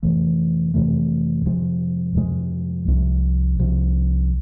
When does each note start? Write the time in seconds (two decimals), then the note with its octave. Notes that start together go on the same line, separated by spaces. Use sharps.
0.03 F2 C3 E3 A3
0.74 F2 C3 E3 A3
1.45 F2 C3 F3 G#3
2.16 F2 C3 F3 G#3
2.88 C2 C3 F3
3.59 C2 C3 F3